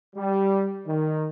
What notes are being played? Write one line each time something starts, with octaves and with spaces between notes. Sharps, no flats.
G3
D#3